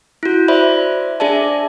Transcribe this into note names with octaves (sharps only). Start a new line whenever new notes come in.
E4 F#4
C5 D5 E5 B5
D4 G#4 D5 E5 A5